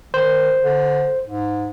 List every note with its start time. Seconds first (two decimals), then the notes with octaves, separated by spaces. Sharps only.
0.14 D#3 C5
0.63 D3
1.27 G#2